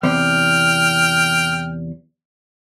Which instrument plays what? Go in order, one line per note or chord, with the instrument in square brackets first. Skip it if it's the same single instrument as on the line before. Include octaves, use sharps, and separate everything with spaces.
[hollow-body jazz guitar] E2 C3 [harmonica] G5 F6